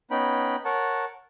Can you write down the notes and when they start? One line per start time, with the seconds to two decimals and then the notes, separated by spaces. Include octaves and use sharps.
0.11 B3 C#4 D#4 G5 B5
0.65 A#4 C#5 F#5 A5